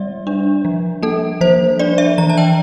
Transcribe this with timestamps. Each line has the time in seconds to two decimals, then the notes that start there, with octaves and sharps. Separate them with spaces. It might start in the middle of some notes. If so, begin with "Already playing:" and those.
Already playing: G3 C4 D5 E5
0.27 D4
0.65 F3
1.03 A#3 A4
1.41 F3 C5
1.79 D4 D5
1.98 E5
2.18 E3 A#5
2.29 A5
2.38 G5